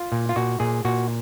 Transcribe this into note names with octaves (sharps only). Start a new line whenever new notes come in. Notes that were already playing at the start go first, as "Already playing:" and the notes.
Already playing: F4
A#2
F4
A#2 F#4
A#2 G#4
A#2 F#4